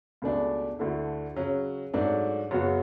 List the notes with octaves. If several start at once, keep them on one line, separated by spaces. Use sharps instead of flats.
C#2 B2 A3 D4
D2 D3 A3 E4
C#3 F#3 C#4
G#2 F#3 A3 D4
F#2 C#3 F#3 B3 F#4